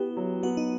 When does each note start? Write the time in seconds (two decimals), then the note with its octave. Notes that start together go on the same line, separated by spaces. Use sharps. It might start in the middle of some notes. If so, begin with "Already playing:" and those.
Already playing: B3 E4 G4
0.17 F#3
0.43 B3 F#4
0.57 D#4